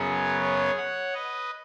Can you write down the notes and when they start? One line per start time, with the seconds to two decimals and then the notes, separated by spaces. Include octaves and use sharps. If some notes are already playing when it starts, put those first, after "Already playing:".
Already playing: F#2 C#3 F#3 B3 G#4 C#5
0.41 G#4 C#5
0.77 C#5 F#5
1.13 B4 D#5